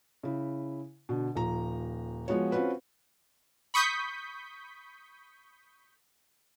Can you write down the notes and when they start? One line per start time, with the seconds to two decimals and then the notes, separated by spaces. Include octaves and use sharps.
0.23 C#3 E4
1.09 B2 D3
1.36 D#1 F3 A#5
2.28 F3 G#3 B3 F#4 C#5
2.52 C4 C#4 F4 F#4 B4
3.74 B5 C#6 D#6 G6 B6